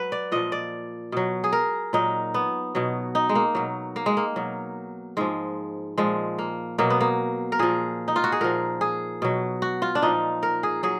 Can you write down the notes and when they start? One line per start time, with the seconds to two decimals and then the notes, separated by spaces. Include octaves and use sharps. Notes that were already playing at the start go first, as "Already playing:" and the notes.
Already playing: F#3 B4
0.12 D5
0.32 A#2 F3 D#5
0.52 D5
1.12 B2 F#3
1.44 G#4
1.53 A#4
1.93 A#2 F#3 D#4
2.34 B3
2.75 B2 F#3
3.15 D#4
3.29 G#3
3.35 A#3
3.55 B2 F#3
3.96 A#3
4.06 G#3
4.17 A#3
4.36 B2 F#3
5.17 G#2 F3 G#3
5.98 A#2 F3 G#3
6.39 A#3
6.78 B2 F#3 A#3
6.90 B3
7.01 A#3
7.52 A#4
7.59 A#2 F3 G#4
8.08 D#4
8.16 F4
8.24 F#4
8.32 G#4
8.41 A#2 F3 A#4
8.81 G#4
9.22 B2 F#3
9.62 F#4
9.82 F4
9.95 D4
10.02 A#2 F3 D#4
10.43 A#4
10.63 G#4
10.83 F#3 G#4